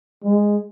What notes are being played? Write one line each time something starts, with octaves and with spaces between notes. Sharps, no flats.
G#3